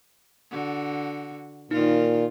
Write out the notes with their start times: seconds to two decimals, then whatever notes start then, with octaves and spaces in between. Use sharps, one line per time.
0.51 D3 F#4
1.71 A#2 D#3 D#4 F4